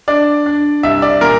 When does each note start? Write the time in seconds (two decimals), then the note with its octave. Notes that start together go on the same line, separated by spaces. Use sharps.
0.08 D4 D5
0.46 D4
0.83 C2 E5
1.02 D5
1.21 A#2 A#4